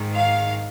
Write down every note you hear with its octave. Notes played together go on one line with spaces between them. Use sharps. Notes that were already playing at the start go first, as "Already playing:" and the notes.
Already playing: G#2 D#3
F5